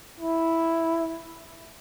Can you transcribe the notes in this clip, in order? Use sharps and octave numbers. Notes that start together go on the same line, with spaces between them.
E4